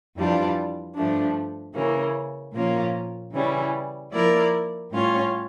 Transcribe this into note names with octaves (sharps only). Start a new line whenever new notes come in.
F2 E3 G3 D4 F4
G2 F3 A3 D4
C#3 E3 A#3 C#4
A#2 F3 A#3 C#4 F4
C#3 E3 G3 C#4
F3 A#3 E4 A#4 D5
A2 G3 C#4 F4 C#5